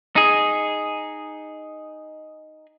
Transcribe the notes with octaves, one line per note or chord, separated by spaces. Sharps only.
D#4 G#4